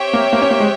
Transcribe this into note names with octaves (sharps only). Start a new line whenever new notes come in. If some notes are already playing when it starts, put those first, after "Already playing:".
Already playing: C4 G4 C#5 E5 G5
A#3
A#3
C#4
A#3
G#3